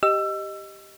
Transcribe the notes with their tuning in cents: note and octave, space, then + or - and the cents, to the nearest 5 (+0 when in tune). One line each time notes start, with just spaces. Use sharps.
G4 +0 D#5 +0 E6 +25